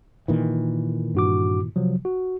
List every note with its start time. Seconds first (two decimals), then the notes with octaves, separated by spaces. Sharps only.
0.28 A#2 D#3 E3
1.15 G2 F#4 D6
1.76 C3 F3 F#3
2.05 F#4